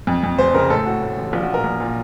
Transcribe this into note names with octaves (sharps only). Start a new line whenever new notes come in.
F2
F2
F1 C5
C#3 A#4
A2 A4
A2 F#4
A2
A1
A#1 F4
F#4
A#2
A#4
A#1
A#2